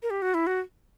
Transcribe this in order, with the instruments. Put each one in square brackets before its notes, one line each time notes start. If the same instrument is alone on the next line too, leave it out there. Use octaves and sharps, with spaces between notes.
[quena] A#4
G4
F#4
E4
F#4